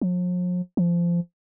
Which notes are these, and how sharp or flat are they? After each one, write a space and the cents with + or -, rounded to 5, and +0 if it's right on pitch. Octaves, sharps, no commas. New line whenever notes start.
F3 +45
F3 -20